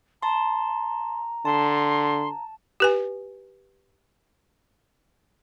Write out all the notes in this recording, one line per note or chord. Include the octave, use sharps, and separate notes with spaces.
A5 A#5 C6
D3 A5 C6
G4 B4 G#5